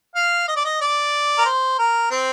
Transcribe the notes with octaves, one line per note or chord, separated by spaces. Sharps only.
F5
D#5
D5
D#5
D5
A#4
C5
A#4
C4